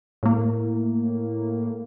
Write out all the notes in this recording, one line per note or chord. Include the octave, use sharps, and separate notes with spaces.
A2 A#3